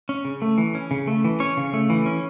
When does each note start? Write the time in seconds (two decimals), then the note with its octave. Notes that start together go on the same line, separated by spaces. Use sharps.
0.09 C#4
0.25 C#3
0.42 A3
0.58 E3
0.75 C#4
0.91 C#3
1.07 A3
1.25 E3
1.40 C#4 C#5
1.57 C#3
1.73 A3
1.90 E3
2.06 C#4